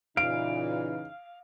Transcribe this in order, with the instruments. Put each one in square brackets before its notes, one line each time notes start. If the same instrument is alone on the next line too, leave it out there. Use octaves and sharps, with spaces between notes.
[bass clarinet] A#2 [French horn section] C#3 E3 D#4 [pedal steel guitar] F5 [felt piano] D7